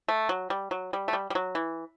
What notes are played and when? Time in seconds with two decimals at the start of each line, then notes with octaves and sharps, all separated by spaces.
0.08 A3
0.29 F#3
0.50 G3
0.71 F#3
0.93 G3
1.08 A3
1.13 G3
1.30 G3
1.35 F#3
1.55 E3